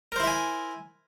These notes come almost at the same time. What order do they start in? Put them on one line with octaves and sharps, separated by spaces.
A#4 C5 E4 E5 G#5